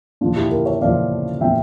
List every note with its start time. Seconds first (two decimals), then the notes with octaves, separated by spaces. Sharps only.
0.21 A#2 F3 D4 F4
0.36 E4 G4
0.51 G4 A#4
0.66 C#5 E5
0.81 A#2 F3 D5 F5
1.41 A#2 F3 E5 G5